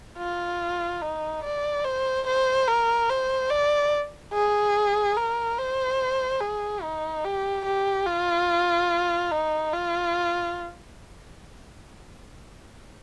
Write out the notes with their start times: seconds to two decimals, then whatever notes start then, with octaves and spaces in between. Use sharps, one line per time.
0.19 F4
1.02 D#4
1.44 D5
1.85 C5
2.27 C5
2.68 A#4
3.10 C5
3.51 D5
4.34 G#4
5.17 A#4
5.58 C5
6.41 G#4
6.83 D#4
7.25 G4
7.65 G4
8.07 F4
9.32 D#4
9.73 F4